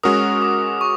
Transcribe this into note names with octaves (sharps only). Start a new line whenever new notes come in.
G#3 C#4 F#4 A#4 D#6
D6
C#6